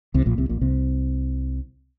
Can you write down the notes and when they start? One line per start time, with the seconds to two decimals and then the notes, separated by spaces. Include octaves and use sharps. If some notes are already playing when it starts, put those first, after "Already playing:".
0.14 C2 C3
0.26 A#1 A#2
0.38 C2 C3
0.49 A#1 A#2
0.61 C2 C3